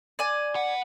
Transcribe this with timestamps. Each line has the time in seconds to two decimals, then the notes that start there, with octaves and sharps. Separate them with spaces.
0.19 D5 G#5
0.55 B4 F#5